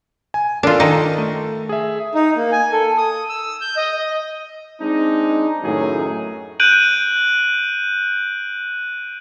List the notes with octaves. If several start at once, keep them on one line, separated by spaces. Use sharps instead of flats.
G#5
D4 F4 A4 A#4
D#3 D#4
A3
G#4 E5
D#4
A#3
G#5
A4
D#6
E6
G6
D#5
D#5
G#3 C4 D4 D#4
F#2 A2 D#3 F#3 D#4 G#4
F#6 G6 D7 D#7 F#7